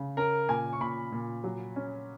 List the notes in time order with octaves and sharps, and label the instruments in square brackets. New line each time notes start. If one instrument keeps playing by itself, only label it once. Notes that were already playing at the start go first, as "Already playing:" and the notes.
Already playing: [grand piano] C#3
[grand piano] C#4 [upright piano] A#4
[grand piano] A#2 [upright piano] G#5
[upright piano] C#6
[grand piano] A#2 [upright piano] B5
[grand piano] A#2
F#3
C#4